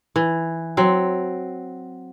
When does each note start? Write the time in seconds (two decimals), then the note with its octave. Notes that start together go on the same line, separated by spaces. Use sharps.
0.16 E3
0.77 F#3 C4